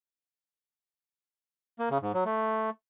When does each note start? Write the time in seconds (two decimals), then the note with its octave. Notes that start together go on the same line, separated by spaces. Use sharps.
1.79 A#3
1.91 C#3
2.02 G#2
2.14 F#3
2.25 A3